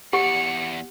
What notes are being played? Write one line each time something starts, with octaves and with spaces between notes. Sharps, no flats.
E2 G4 D5 F#5 C#7